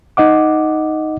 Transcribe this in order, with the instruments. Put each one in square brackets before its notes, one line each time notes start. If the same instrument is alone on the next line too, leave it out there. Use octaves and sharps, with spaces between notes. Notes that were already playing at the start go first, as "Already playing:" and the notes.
[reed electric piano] D#4 D#5 F#5 D6